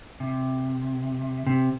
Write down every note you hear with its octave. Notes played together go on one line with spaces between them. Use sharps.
C3
C3